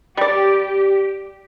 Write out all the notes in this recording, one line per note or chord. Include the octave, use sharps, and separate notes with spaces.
G3 G4 D5